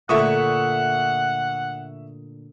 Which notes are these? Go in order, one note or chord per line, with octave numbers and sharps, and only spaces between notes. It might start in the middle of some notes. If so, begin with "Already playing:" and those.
A#2 D3 A3 E5 F#5 C#6 D#6